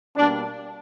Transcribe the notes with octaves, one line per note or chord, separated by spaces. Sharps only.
B2 G3 A#3 D4